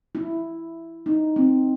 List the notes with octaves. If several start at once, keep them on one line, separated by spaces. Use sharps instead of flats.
E4
D#4
C4